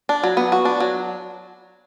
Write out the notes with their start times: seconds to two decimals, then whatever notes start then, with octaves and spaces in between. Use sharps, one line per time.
0.09 D4
0.23 F#3
0.37 B3
0.52 F#4
0.65 D4
0.80 F#3